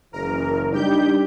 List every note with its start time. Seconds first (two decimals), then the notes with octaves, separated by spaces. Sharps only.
0.13 F#1 E3 A#4
0.73 G3 D4 D#4 G4 G6